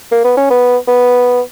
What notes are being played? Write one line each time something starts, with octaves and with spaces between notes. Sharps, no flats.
A#3
B3
C#4
B3
B3